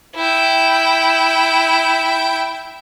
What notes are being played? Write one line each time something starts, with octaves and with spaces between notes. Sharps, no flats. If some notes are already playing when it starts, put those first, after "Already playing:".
E4 G5